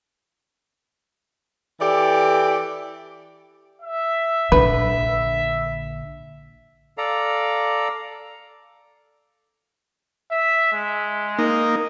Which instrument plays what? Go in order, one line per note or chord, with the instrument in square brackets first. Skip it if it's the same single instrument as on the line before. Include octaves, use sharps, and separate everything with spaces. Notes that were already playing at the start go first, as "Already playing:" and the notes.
[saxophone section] E3 G4 A4 D5
[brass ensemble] E5
[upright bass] A#1 D3 [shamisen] B4
[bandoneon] A4 D5 F5 A#5
[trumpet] E5
G#3
[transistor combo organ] A#3 D#4